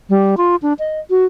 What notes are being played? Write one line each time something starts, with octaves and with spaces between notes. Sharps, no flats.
G3
F4
D4
D#5
F#4